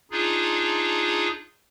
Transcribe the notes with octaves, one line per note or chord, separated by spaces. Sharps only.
D4 D#4 F4 G#4